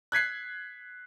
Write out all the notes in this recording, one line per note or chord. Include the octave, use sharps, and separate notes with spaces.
F#6 G#6 B6 C7